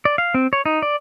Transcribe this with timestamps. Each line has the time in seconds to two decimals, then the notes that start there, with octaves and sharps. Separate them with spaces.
0.05 D5
0.18 F5
0.34 C4
0.53 C#5
0.66 D#4
0.82 D5